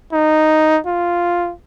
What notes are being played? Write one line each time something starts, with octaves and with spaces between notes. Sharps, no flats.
D#4
F4